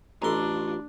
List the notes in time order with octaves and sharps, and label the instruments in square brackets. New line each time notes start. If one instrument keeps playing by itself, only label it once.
[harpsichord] A1 C6 [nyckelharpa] D4 [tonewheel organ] F4 [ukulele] A4 D#5 A#5